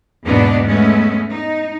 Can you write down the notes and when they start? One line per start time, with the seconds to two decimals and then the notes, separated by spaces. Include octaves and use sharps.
0.25 E2 G#2 B2 A#3 B3 D4
0.64 G#3 A3 B3 C#4
1.29 D#4